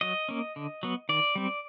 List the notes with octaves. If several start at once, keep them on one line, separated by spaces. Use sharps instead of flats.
F#3 D#5
A#3 C#4
D3
F#3 B3
D#3 D5
G3 C4